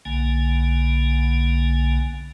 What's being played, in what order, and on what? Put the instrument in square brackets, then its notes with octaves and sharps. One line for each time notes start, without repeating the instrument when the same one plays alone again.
[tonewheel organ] B1 D3 A#3 G#5